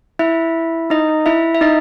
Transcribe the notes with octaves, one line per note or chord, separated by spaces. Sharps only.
E4 E5
D#4 D#5
E4 E5
E5
D#4 D#5